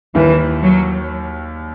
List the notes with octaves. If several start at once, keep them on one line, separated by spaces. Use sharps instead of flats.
D#2 D#3 E3 G3
F#3